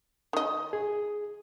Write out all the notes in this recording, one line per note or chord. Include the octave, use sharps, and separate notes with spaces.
D#3 D#5
G#4